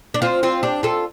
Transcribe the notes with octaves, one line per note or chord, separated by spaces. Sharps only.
D4
C4 F4
C4 F4
D4 G4
F4 A4